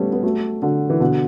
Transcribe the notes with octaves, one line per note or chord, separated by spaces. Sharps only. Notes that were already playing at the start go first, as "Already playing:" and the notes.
Already playing: G3 A3 B3 C#4
B3
F#3 A3
D3 F#3
E3
B2 D3